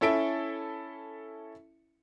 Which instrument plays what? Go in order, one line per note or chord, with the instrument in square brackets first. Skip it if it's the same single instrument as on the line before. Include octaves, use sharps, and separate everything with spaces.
[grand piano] C#4 E4 A4 E5 D7